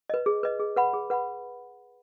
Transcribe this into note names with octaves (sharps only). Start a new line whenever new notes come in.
B4 D#5
G#4
B4 D#5
G#4
B4 F#5 B5
G#4
B4 F#5 B5